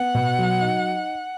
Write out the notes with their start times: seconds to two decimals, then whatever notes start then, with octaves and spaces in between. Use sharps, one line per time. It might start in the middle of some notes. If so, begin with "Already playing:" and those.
Already playing: B3 F#5
0.14 B2
0.38 F#3
0.61 D#4